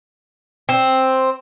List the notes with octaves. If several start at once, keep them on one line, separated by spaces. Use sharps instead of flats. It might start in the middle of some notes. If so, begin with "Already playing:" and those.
C4